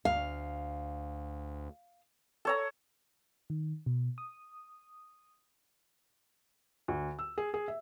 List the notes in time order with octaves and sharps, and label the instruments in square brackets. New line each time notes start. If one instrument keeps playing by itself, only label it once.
[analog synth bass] D2 [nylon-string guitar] F5
[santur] A4 C#5 A#5
[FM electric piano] D#3
B2
D#6
[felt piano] D2
E6
G#4
G#4
E5